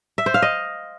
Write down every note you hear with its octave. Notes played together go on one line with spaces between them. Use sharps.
E5
C5
F5
D#5